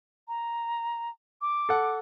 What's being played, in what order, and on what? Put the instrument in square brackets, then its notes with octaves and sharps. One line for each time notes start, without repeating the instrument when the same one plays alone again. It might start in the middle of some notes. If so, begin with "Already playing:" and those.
[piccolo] A#5
D6
[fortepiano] A4 F#5